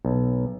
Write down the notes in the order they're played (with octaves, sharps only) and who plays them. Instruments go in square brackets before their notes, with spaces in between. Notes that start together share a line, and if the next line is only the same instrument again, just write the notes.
[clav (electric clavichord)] B1